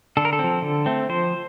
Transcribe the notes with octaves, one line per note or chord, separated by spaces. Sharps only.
D3 A4
A#4
A4
F3 C4
D3
A3 C4
F3 C5